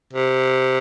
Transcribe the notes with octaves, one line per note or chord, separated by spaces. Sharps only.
C3